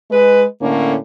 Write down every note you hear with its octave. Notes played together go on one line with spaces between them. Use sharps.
G#3 B4
A2 D3 A#3 C#4